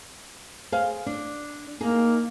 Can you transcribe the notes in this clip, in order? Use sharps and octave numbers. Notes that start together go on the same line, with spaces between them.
G#4 C5 F5
D4
A#3 D#4 G#4